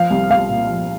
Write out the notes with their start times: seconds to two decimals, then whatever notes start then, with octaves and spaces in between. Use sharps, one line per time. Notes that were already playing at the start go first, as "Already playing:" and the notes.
Already playing: F3 F5
0.10 C2
0.30 C2 F5
0.50 A#2
0.69 F3